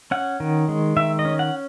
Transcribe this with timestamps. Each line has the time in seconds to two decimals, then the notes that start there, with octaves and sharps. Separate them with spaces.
0.11 C#4 F#5
0.40 D#3
0.68 G#3
0.97 D#3 E5
1.19 D#5
1.25 C#4
1.39 F#5